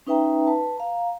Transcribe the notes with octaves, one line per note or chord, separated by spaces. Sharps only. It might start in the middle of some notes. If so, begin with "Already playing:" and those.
C#4 D#4 B4 E5 G5 A#5
B4 A5
F5 A#5